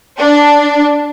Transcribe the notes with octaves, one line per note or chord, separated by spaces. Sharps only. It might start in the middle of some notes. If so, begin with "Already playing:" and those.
D4